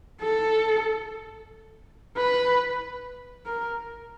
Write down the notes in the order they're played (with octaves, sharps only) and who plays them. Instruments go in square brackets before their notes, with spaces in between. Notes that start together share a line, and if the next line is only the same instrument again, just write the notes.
[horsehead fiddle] A4
B4
A#4